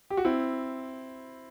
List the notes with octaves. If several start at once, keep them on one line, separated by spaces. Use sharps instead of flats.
G4
F#4
C4 E4